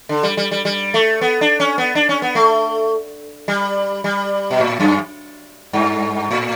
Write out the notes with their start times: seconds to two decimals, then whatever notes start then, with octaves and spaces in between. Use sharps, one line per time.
0.09 D3
0.23 G3
0.37 G3
0.51 G3
0.65 G3
0.94 A3
1.21 B3
1.41 D4
1.60 C#4
1.78 B3
1.95 D4
2.09 C#4
2.22 B3
2.35 A3
3.48 G3
4.04 G3
4.51 B2
4.60 A2
4.80 F#2
5.73 G2
6.31 A2